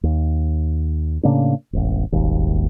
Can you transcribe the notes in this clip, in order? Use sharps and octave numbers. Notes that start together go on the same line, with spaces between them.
D#2
A2 C#3 A#3 D4
E1 A1
D#1 G#1 D#2